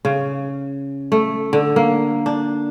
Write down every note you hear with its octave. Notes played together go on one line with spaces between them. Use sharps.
C#3
A3
D3
A#3
D4